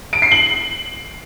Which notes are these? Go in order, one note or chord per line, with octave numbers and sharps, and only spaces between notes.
D7
C7
F#7